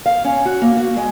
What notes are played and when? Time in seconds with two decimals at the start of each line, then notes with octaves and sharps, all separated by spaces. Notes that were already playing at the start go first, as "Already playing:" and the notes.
0.06 F5
0.25 C#4
0.45 F#4
0.62 A#3
0.77 F#4
0.97 G#3